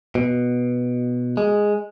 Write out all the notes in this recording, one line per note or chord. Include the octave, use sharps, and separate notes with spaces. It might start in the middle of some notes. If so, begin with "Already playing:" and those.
B2
G#3